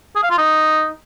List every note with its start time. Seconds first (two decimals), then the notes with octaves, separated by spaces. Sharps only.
0.16 G#4
0.23 F5
0.31 F4
0.38 D#4